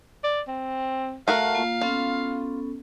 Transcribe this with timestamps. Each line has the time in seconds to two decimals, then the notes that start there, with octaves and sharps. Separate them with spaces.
0.24 D5
0.47 C4
1.28 A3 F#4 A#4 F5
1.55 A#3 F4
1.81 B3 C#4 F4 A4